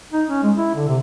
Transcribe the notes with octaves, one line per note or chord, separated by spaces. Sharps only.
D#4
C#4
G#3
E4
D3
C3